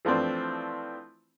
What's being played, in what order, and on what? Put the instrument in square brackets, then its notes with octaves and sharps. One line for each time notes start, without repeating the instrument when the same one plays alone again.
[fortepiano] E3 F3 A3 C4 D4